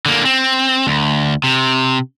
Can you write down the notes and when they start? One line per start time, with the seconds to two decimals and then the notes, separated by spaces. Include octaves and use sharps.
0.06 D3 A#3
0.25 C4
0.87 D2
1.44 C3